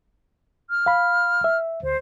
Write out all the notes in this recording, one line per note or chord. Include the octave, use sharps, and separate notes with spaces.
F6
F5 B5
E5
D2 C5